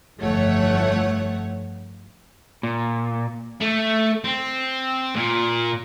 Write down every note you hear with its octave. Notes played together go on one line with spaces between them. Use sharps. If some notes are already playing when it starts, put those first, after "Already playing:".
G1 F2 E3 A3 C#5 F#5
A#2
A3
C4
A#2